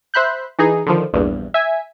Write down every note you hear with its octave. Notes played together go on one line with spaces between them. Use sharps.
C5 E5 B5 F#6 G6
E3 D#4 G#4
D3 D#3 F3
A#1 E2 G2
E5 G#5